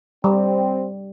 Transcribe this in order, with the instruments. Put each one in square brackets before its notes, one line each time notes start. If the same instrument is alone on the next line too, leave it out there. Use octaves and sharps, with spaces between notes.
[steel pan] G3 [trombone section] C4